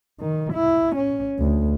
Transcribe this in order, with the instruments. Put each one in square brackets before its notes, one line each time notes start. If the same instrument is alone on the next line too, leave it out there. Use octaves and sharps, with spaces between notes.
[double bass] D#3
E4
C#4
D2